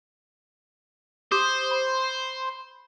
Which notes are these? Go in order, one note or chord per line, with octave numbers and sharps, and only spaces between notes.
G4 C5 D6 D#6
B5